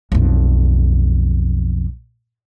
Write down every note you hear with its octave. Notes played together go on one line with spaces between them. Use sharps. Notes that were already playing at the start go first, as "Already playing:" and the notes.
B1 F2